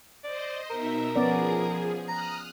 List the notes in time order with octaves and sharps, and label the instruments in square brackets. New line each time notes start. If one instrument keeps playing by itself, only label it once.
[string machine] C5 D#5 [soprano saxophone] D5
[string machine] B2 D#4 E5 [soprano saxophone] A#4
[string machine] F3 G#4 [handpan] B3 C#4 D5
[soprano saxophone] A#5 [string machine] D#6 F6 F#6